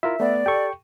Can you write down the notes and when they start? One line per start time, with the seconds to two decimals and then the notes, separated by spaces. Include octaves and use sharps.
0.03 E4 F4 A#4 E5
0.20 A3 B3 D5
0.46 G4 A4 G5 C#6